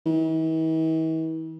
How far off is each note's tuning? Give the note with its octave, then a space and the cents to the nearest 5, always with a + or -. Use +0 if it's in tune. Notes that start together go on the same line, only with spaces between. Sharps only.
E3 -45